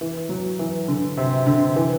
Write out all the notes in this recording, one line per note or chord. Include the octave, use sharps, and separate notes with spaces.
E3
F#3
E3
D3
C3
D3
E3